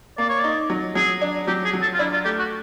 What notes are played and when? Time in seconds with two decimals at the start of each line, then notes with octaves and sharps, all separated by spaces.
0.18 A#3 D5
0.29 C#5
0.39 D#4 D5
0.70 F#3
0.95 F#3 G#4
1.22 D4
1.47 F#3 G4
1.64 G#4
1.73 F#3
1.82 A4
1.93 F4
1.99 D4 E4
2.12 F4
2.24 A3 G4
2.38 F#4